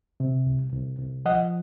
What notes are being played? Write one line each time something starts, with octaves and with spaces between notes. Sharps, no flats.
C3
C2
C2
C2
F3 D#5 F#5